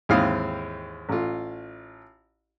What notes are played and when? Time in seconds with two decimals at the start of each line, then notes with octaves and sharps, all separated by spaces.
0.09 D#2 G#2 E3 C4 F5 D#6
1.09 A1 F4